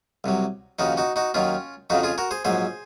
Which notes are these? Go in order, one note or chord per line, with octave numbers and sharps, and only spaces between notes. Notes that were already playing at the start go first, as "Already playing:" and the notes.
C2 C3 F#3
D#2 C#3 F3 D#4 F#4
D#4 F#4
D#4 F#4
D#2 D#3 F#3 C#4 F4
F2 C#3 F3 D#4 F#4
F4 G#4
F#4 A#4
G#4 C5
A#1 G#2 F#3 G#4 C5